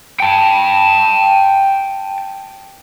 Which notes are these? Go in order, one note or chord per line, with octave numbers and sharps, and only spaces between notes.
G5 A5